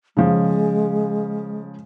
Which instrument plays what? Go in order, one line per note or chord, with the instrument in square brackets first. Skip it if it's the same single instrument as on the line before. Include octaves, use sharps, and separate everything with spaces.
[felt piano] C#3 F3 [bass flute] G#3